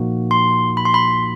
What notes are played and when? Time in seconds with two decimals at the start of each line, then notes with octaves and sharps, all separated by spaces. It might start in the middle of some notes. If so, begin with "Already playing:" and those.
Already playing: A#2 F3 A#3 D#4 F#4
0.31 C6
0.77 B5
0.85 C6
0.94 B5